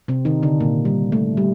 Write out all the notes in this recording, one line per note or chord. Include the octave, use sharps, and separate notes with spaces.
C3 C4
D#3 D#4
D3 D4
A#2 A#3
G3
A3
G3